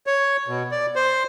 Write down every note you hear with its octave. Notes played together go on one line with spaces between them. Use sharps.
C#5
B2
D5
C5